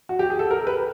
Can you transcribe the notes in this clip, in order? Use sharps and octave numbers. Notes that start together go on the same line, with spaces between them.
F#4
G4
G#4
A4
A#4
B4